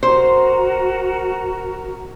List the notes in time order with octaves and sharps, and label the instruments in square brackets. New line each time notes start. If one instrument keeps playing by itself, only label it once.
[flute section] F#4 A#4 A#5 [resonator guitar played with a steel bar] C5